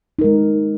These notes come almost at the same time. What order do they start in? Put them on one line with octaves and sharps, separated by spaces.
D#4 A#4 G#3